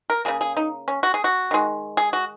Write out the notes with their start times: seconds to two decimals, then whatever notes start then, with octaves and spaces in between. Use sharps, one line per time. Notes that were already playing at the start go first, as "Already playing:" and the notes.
0.10 A#4
0.25 C#3 F#3 A#3 G#4
0.41 G#4
0.57 D#4
0.88 C#4
1.03 F#4
1.14 G#4
1.24 F#4
1.51 D#3 G#3
1.97 G#4
2.13 F#4